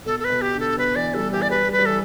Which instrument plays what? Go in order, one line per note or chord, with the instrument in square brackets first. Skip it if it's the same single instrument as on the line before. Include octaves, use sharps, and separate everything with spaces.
[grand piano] B2 [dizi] A4
[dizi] A4
B4
[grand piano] B2
[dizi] G4
[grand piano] D3
[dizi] A4
[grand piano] B2 [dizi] B4
[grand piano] E3 [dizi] D5
[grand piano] G3 [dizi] A4
[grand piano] E3 [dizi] G4
[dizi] D5
[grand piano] G3 [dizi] B4
[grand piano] G3
[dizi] B4
[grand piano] G3
[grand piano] E3 [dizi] A4